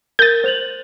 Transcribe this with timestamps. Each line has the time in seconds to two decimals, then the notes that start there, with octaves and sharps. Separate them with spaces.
0.19 A#4 G6 A6 D#7
0.44 C5 F7 F#7